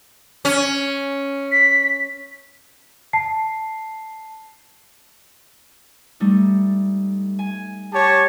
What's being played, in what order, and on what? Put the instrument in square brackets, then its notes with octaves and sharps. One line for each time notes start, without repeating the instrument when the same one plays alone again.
[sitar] C#4
[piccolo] B6
[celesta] A5 C7
[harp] G3 A3 D#4
G#5
[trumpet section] G4 C#5 A5